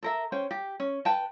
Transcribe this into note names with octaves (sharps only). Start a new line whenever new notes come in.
A4 A#4 E5
C#4 C5 G5
G4
C#4
B4 G5 A5